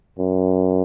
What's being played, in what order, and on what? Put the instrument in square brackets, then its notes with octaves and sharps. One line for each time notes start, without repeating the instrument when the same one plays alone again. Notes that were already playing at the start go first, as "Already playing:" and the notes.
[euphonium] F#2